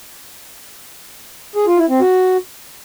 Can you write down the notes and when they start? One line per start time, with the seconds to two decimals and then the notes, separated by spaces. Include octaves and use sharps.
1.56 G#4
1.67 F4
1.78 E4
1.89 C4
2.01 F#4